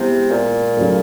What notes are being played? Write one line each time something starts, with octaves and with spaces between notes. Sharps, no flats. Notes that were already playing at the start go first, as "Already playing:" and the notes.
Already playing: C3 G#3 B3 E4 G#4
A#2
C#3 F#3 A3